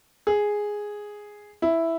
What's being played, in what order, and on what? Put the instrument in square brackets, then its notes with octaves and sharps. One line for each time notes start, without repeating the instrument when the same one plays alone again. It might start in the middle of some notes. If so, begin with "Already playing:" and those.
[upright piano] G#4
E4